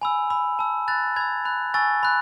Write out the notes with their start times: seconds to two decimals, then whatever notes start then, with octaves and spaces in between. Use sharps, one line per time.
0.01 G#5 B5 E6
0.30 B5 E6
0.59 A5 E6
0.88 B5 F#6 A6
1.16 B5 E6 G#6
1.45 B5 F#6
1.74 G#5 C#6 E6 A6
2.03 B5 F#6